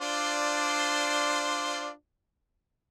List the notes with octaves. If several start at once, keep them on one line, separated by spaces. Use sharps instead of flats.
D4 F4 C5 D5